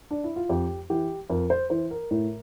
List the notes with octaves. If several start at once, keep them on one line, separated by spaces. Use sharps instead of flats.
D4
E4
F4
F2 G4
E3 G4
F2 A#4
C5
E3 C5
A#4
A2